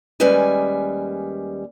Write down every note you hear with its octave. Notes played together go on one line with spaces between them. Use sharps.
D#2 G3 G#3 C#4 B4 G#5